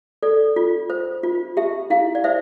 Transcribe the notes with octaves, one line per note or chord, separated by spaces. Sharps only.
A4 D5
F4
C5
F4
G4 E5
E4 F5
D5
C5 E5